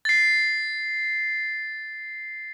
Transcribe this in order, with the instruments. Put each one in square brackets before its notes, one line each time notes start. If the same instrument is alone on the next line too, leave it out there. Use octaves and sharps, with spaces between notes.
[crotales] A6 C7